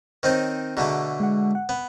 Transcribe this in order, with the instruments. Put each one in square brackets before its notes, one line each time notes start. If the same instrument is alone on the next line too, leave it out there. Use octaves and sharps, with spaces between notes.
[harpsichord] D#3 C4 D#4 [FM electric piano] C5 C#5
[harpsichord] B2 D3 A3 [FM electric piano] G#4 A#5
[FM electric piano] G#3 F#5
F#5
[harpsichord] B3